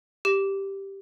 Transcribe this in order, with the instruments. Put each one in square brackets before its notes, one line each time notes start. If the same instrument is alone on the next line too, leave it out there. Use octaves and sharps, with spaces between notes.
[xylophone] G4